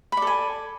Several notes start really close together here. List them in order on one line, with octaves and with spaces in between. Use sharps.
B5 D5 A4 G#5